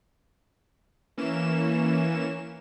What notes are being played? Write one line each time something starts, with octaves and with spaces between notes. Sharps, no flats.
E3 A#3 C#4 E7